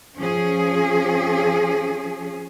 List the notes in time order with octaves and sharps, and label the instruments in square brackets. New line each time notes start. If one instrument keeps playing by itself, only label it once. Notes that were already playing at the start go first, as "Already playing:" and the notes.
[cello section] F3 C#4 G#4